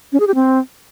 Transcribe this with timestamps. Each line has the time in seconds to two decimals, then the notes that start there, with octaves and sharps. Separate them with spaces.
0.13 C#4
0.20 G#4
0.27 G4
0.35 C4